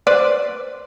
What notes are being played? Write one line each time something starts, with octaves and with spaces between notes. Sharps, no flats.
B4 C5 D5